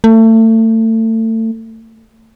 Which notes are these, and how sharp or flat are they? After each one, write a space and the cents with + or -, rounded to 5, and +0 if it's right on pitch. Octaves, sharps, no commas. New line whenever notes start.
A3 +30